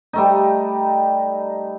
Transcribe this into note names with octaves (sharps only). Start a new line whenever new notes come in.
G3 A3 D#4